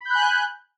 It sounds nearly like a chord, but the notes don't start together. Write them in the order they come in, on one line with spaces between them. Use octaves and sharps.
B5 G6 F#6 G#5